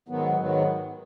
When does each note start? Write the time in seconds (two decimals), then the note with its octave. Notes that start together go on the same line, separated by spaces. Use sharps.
0.08 G#2 D#3 F#3 B3
0.37 G#2 D#3 F#3 B3